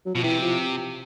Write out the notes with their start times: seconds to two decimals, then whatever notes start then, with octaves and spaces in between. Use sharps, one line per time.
0.06 F#3
0.15 B2 F3
0.23 C3 E3
0.42 F3